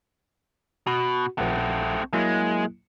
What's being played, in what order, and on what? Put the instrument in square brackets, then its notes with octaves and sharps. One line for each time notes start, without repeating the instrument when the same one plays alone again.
[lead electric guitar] B2 [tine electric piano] F#4
[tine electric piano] A#1 F#5 [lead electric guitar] A3 C4
[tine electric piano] F#3 A#3 E4 [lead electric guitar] G#3